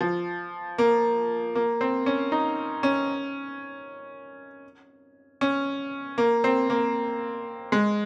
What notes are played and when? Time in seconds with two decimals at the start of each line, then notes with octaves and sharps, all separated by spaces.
0.01 F3
0.78 A#3
1.55 A#3
1.81 C4
2.06 C#4
2.32 D#4
2.83 C#4
5.41 C#4
6.18 A#3
6.44 C4
6.70 A#3
7.72 G#3